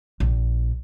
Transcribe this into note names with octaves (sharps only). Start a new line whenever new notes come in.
A#1